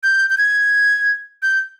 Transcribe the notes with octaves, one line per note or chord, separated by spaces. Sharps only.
G6
G6
G#6
G6